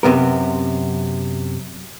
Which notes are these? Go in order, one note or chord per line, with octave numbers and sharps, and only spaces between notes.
F#2 C3 B3 A#4